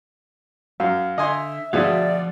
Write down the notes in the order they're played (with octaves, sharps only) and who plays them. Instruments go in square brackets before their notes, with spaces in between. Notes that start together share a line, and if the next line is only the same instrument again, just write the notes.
[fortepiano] F#2 [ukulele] F5
[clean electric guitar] D3 [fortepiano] D#5 G#5 C6 [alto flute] E5
[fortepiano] D2 B2 [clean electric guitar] F3 F5 [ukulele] G#4 E5 [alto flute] D5